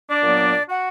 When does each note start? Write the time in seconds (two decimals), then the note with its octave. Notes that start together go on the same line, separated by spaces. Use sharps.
0.09 D4 D5
0.22 A#2 F#3 B3
0.69 F#4 F#5